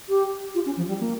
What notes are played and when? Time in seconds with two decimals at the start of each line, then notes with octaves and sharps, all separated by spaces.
0.09 G4
0.55 F4
0.66 C#4
0.77 F3
0.88 G3
1.00 A#3